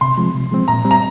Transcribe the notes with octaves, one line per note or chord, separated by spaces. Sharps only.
C3 C6
F3 G#3 C4
C3
F3 G#3 C4
A#2 A#5
G3 C4
A#5